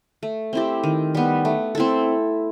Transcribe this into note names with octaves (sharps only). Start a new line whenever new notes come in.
A3
C4 E4 G4
D#3
G3 B3
A3
C4 E4 A4